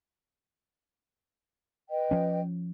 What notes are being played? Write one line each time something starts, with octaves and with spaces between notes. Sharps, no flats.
B4 D#5 G5
F3 C#4